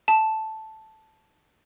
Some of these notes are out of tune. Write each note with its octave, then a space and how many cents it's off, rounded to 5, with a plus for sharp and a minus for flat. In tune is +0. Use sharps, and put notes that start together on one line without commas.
A5 -5